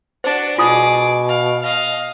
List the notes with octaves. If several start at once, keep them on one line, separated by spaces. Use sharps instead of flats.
D4 F#4 C5
B2 F4 G#4 D6 D#6
F5
D#5 F5